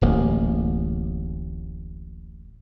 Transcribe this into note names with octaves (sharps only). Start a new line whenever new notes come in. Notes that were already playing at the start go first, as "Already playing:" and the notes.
D1 A1 A#3